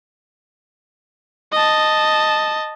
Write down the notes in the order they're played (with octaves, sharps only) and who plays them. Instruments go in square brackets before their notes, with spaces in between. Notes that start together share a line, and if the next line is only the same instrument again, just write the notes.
[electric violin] D#5 A5